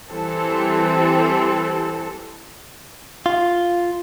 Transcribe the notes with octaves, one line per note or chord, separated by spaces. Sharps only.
E3 G3 C4 A4
F4